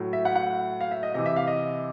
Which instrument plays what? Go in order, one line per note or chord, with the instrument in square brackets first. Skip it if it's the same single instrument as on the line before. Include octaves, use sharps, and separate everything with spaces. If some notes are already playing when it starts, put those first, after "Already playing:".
Already playing: [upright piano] A2 F#3
E5
F#5
F#5
F5
E5
D#5
C3 E3 D#5
E5
F5
D#5